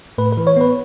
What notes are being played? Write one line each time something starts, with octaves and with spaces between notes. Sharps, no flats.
A2 B4
E3 B4
C#5
B3 B4